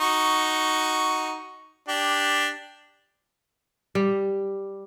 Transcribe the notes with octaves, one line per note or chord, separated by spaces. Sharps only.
D#4 F#4 C#6
D4 G4
G3